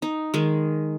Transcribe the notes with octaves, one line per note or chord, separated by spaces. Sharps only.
D#4
D#3 G#3